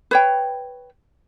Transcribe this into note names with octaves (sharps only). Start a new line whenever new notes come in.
B4 C#5 G5